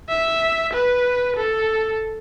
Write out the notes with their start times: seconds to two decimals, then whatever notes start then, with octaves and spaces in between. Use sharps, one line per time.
0.10 E5
0.73 B4
1.36 A4